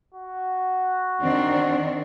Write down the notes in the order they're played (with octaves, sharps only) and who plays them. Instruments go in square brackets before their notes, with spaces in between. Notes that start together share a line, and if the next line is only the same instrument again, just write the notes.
[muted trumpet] F#4
[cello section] D#3 C4 D4